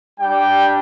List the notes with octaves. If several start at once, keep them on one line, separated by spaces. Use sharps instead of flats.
G3 D4 G4 G5